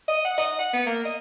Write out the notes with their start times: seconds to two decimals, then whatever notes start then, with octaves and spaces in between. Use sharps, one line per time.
0.08 D#5
0.25 F#5
0.38 D#5
0.59 F#5
0.73 B3
0.86 A#3
1.05 D#5